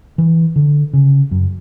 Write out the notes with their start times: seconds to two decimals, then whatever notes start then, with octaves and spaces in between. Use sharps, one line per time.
0.18 E3
0.56 D3
0.94 C#3
1.31 F#2